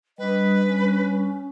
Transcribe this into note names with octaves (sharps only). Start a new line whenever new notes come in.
G3 D4 B4 D#5
C#4